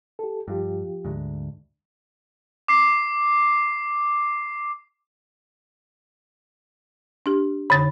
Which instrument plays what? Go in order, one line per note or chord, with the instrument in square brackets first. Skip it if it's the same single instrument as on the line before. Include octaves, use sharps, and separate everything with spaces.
[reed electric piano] G4 A4
[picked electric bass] G2 [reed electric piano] F3 F4 G4
[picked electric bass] D2 G#2
[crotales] D6 C7
[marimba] D4 G4
[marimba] F2 D3 C#5 [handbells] B5 A6